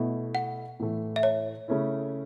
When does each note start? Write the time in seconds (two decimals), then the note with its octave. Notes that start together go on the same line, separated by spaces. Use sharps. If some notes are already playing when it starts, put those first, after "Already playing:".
Already playing: B2 A3 E4
0.35 F#5
0.80 A2 E3 A3
1.16 E5
1.23 C#5
1.68 C#3 A3 C#4 E4